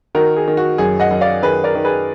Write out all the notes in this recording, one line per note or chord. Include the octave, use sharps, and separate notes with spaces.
D#3 F#4 A#4
G#4
D#3
F#4
F#2 G#4
D#5 F#5
F#2
D5 F5
D#3 G#4 B4
A#4 D5
D#3
G#4 B4